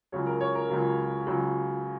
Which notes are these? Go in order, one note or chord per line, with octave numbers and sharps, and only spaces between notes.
C#2 C#3 F#3 C#5
A#4
C#5
A#4
C#2 C#3 F#3 A#4
C#2 C#3 F#3